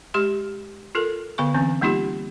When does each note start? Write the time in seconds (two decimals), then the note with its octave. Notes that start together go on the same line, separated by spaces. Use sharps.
0.14 G#3 G4 C6
0.95 F4 A4 A#4
1.38 D3 B3 B4 F5 C#6
1.54 E3 C4 C#4
1.81 G3 A#3 D#4 F4 G4